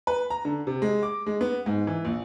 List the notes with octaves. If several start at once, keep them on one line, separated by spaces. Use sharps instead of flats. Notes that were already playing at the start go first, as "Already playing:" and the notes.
B4
A#5
D3
C3
G#3
D6
G#3
B3
G#2
E3
A#1